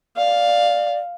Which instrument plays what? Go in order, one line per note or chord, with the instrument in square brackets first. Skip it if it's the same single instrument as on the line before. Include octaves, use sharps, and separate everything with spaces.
[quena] D5 [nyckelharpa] F5